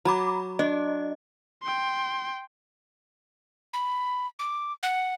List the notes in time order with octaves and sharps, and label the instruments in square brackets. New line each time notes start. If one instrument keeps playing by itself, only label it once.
[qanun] F#3 [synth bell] A#5 B5 D6
[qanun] D4 [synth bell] D#5
[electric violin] G5 C6
[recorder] B5
D6
F#5